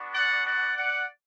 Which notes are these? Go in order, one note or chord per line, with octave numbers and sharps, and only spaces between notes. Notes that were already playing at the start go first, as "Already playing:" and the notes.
Already playing: B3 D4 F#4
D5 F#5
D5 F#5
D5 F#5